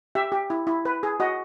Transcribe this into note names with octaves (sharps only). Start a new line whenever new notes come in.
G4 E5
G4
E4
E4
B4
G#4
F#4 D#5